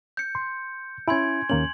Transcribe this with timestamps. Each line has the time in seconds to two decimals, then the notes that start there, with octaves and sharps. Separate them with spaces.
0.17 G6 C#7
0.35 C6
1.08 C#4 E4 G#5 C6 G#6
1.49 D#2 A#3 C#4 F#7